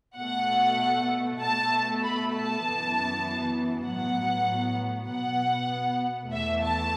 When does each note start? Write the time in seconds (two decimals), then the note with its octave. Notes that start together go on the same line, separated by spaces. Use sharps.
0.18 B2 A3 F#5
1.41 B2 A3 A5
2.03 B5
2.34 A5
2.64 F#2 E3 B3
3.87 A2 F#3 B3 F#5
5.09 B2 B3 F#5
6.32 E2 E3 A3 E5
6.63 A5